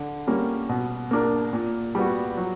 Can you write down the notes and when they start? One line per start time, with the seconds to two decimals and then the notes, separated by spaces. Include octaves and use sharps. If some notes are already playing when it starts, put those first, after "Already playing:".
Already playing: D3
0.27 G3 A#3 C#4
0.69 B2
1.11 A#3 D4 A#4
1.53 A#2
1.95 G3 B3 F#4
2.37 F#3